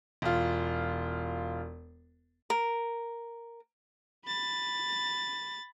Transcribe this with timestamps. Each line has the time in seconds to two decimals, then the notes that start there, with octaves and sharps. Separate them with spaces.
0.22 E1 F4
2.50 A#4
4.26 B5 A6